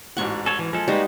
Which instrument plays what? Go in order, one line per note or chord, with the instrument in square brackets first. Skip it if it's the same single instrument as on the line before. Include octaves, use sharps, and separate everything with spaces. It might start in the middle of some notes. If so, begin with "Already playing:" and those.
[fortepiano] A1 G#2 F#4 [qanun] F#5 C#6
[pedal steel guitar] A4 C#5 [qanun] G#5
[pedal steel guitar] E3
[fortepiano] F3 [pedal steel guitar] G#3 A4
[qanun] G3 D#4 [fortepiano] G#3 B4 [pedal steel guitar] A#3 B3 F#4